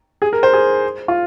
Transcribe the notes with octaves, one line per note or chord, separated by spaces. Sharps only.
G#4
A#4
C5
G#4
F4